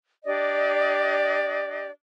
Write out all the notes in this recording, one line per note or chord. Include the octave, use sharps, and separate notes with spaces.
D4 G4 D5 D#5